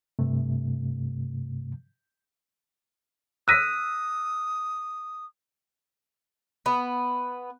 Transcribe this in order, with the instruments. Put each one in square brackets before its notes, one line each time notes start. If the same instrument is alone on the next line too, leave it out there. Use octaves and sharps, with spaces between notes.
[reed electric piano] G2 C3 A3
[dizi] D#6 [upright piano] E6 A#6 B6 [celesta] F#6 D#7
[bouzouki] B3